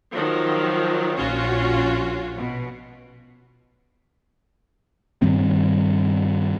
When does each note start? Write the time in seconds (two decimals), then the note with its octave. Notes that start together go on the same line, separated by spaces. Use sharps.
0.14 D#3 F3 F#3
1.17 A#1 C#4 F4 F#4
2.36 B2
5.22 G2 D#3 G3 C4